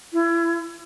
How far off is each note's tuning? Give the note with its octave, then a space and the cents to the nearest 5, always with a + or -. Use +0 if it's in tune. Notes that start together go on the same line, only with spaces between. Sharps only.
E4 +30